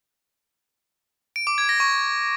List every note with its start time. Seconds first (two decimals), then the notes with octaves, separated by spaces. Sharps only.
1.36 D7
1.47 D6
1.58 G#6
1.69 A#6
1.80 C#6